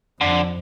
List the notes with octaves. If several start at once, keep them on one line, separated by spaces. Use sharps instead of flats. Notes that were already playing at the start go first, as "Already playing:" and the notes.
F2 D3